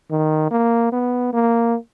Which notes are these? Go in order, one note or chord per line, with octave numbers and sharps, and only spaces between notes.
D#3
A#3
B3
A#3